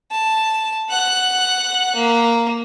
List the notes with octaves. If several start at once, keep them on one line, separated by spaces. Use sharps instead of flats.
A5
F#5 F#6
A#3